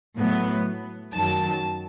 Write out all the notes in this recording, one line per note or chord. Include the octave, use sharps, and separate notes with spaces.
A2 F#3 B3
F#2 D#3 F#3 A5